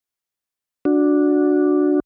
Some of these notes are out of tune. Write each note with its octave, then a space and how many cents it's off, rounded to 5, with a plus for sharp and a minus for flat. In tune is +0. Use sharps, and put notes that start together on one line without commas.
D4 +0 F#4 -15